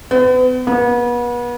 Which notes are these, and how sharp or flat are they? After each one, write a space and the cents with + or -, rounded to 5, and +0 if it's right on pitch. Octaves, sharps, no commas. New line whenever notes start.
B3 +40
B3 -35